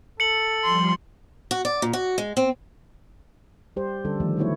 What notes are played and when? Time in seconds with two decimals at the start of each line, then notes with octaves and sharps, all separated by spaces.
0.20 A4 C#7 F#7
0.64 F3 G3 C6
1.51 F#4
1.65 D5
1.82 A#2
1.93 F#4
2.18 G#3
2.37 C4
3.76 G3 G4 C5
4.05 D3 G3 C#4 A4
4.20 D#3 F3 A3
4.37 D3 F#3 A3 B3 E4 C#5